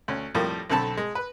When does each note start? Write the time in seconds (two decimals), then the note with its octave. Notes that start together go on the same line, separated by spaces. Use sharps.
0.08 D2 C#4
0.35 F2 A2 G3 A#3
0.70 B1 D3 C4 A4 A5 B5
0.97 G#3
1.15 B4